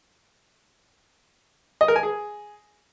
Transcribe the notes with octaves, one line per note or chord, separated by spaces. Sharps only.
D#5
A#4
G#5
G#4